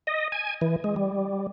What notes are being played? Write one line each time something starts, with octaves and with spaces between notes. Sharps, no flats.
D#5
G#5
E3
G#3
G3